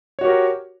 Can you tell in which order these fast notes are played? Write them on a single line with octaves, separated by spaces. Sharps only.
C#5 F#4 G4 A#4